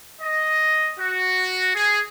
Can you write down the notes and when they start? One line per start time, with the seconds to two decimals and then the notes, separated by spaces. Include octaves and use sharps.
0.22 D#5
0.99 F#4
1.75 G#4